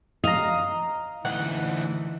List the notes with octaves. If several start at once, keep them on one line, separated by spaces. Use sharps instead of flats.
D#5 F5 A#5
D2 E3 D#4 F#5